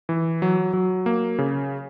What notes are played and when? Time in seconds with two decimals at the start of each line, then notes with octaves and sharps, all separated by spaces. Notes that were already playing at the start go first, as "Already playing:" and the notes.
0.09 E3
0.42 F#3
0.73 F#3
1.06 A#3
1.39 C#3